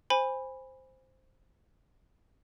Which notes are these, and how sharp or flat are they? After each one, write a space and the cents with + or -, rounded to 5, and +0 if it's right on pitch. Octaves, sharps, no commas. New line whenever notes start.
C5 +0 G#5 -25 B5 +0